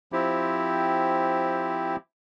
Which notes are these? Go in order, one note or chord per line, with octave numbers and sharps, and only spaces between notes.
F3 C4 E4 G4